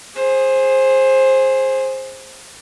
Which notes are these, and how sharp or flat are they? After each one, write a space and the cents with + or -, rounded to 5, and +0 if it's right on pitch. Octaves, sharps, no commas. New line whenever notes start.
G#4 -5 C5 +15